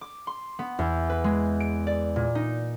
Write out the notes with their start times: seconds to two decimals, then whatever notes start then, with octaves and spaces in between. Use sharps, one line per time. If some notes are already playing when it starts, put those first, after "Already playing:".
0.01 D6
0.27 C6
0.59 B3
0.79 E2
1.10 B4
1.24 G#3
1.60 D7
1.87 D5
2.16 A#2
2.35 D#4